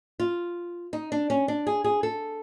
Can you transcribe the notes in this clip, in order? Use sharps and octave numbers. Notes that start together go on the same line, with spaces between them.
F4
D#4
D4
C#4
D4
G#4
G#4
A4